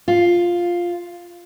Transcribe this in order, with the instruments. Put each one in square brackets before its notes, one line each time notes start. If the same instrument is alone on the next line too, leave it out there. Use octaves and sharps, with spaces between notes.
[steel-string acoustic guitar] F4